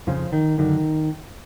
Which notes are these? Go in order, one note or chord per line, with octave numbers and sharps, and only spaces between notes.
F2 C#3 F3
D#3
F#2 D3 D#3